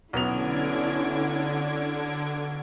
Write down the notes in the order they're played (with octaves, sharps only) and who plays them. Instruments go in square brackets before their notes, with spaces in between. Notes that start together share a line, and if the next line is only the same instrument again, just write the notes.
[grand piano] B1 B3 F7 [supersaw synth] D3 G#6 D7 [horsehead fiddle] C#4 E4